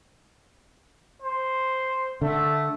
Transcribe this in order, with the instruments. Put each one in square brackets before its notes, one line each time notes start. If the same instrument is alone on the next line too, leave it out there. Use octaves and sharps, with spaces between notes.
[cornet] C5
[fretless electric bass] D3 [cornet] A3